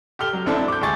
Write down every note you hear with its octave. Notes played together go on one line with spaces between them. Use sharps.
G4 A4 F6 G7
F#3
A1 C4 D4 E4 A4 A5
D6 G6
D2 G#3 G#5 C#6 A6